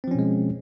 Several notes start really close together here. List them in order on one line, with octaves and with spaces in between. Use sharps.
C4 F3 C#4 B2 G#3